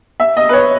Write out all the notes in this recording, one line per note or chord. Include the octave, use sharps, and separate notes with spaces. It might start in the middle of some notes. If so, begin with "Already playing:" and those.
E5
D#5
B4
C#5